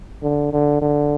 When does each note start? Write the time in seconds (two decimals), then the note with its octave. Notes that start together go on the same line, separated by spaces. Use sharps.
0.23 D3
0.53 D3
0.82 D3